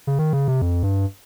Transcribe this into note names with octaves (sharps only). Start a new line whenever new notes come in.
C#3
D#3
C#3
C3
F2
G2